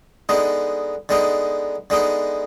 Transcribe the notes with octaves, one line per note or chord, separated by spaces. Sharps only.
D3 G#3 B3 D#4
D3 G#3 B3 D#4
D3 G#3 B3 D#4